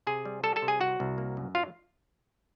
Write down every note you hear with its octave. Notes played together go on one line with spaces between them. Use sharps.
C3 G#4 G#5
G3
G3 A4 A5
A4 A5
C3
G#4 G#5
C2 F#4 F#5
C2
A#3
F#2
F#3 F4 F5